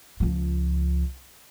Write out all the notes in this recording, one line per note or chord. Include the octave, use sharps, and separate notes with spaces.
C#2 F3